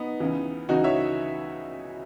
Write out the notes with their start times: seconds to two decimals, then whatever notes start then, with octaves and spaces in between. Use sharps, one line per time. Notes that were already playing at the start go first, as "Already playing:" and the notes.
Already playing: B3 D#4
0.20 C#2 C#3 E3
0.69 C#2 C#3 E3 D#4 F#4
0.84 C#5 E5